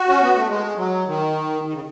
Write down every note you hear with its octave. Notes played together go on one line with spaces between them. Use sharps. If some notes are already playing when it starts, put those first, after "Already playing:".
Already playing: F#4
C#4
B3
A3
G#3
F#3
D#3
D#3
C#3